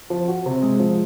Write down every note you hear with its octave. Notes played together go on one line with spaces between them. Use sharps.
F3
F#4
C3
G#3
F3